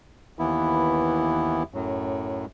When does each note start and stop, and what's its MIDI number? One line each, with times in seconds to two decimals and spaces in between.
0.39 1.63 39
0.39 1.63 52
0.39 1.63 59
0.39 1.63 64
1.74 2.45 42
1.74 2.45 45
1.74 2.45 54